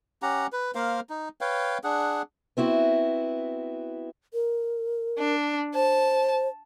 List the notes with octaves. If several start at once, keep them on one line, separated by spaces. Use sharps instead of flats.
C#4 G4 F#5 A#5
B4
A#3 A#4 C5 F5
D#4
B4 C#5 F5 G5
D4 G#4 F#5
B3 C4 E4 F#4
A#4
D4
C5 A5